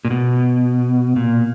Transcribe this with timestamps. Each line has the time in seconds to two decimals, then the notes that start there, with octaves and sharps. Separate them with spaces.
0.05 A#2
0.10 B2
1.16 A#2